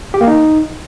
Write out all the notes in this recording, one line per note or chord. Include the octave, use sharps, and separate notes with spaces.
G4
A#3
D#4